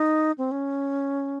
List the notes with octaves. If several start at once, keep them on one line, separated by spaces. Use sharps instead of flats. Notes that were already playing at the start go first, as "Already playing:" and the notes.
Already playing: D#4
C4
C#4